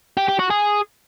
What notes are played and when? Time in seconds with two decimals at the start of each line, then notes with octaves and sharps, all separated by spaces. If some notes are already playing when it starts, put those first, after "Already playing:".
0.17 G4
0.28 G4
0.39 F#4
0.50 G#4